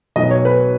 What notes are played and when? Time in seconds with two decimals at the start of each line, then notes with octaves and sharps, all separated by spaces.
0.16 B1 B2 F#3 D#5
0.31 C#5
0.45 B4